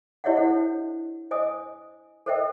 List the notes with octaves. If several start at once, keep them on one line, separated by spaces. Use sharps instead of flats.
E4 G4 C#5 D#5 E5 F#5
D4 E4 A4 C5 F#5
C5 D#5 G#5 D#6
A4 A#4 C5 D#5 E5 G5